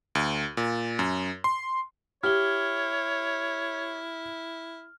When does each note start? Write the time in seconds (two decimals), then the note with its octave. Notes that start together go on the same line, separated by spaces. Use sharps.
0.15 D2
0.57 A#2
0.99 F#2
1.44 C6
2.24 E4 G4 C#5 F6 G7